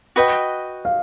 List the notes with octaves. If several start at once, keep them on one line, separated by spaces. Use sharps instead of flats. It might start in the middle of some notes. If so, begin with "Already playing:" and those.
F#4 B4 D#5 G5
F5